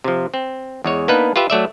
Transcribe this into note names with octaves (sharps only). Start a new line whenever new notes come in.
C3 F3
C4
E2 G#3 C#5
A#3 B3 D4 D#4 B4
F4 G4 B4 E5
F#3 A3 D5 E5